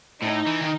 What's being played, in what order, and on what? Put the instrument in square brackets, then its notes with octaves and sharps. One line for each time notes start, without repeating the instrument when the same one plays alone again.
[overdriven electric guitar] A2 [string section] D#4
[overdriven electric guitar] E3
D#3